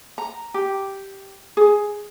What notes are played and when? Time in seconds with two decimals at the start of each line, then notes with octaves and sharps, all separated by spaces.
0.18 A#5
0.54 G4
1.57 G#4